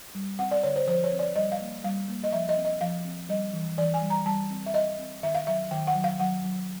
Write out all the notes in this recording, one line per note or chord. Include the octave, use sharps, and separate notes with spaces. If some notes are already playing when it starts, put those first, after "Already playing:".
G3
C4 F#5
D5
D3 C#5
C5
F3 C5
C#5
C4
D5
G3 D#5
F5
A#3
G3 F5
A#3
D#5
F3 E5
D#5
C4
D#5
F3 F5
C4
G3 D#5
E3
E3 D5
G#5
G3
A#5
G3 A5
C4
E5
C4 D#5
C4
D#3 E5
F5
F#3 E5
D#3 G5
F#5
F#3
F5
F#3 F#5
F#3